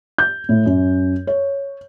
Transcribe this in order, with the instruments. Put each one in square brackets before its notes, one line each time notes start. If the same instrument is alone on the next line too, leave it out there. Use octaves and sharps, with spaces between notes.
[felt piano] G6
A2
F#2
C#5